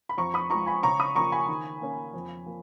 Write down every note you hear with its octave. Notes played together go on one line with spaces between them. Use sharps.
B5
F2 A#5 C#6
B5 D#6
F3 G#3 A#5 C#6
G#5 B5
C#3 A#5 C#6
B5 D#6
F3 A#3 C#4 A#5 C#6
G#5 B5
D#3
A#3 C#4
F2
F3 A#3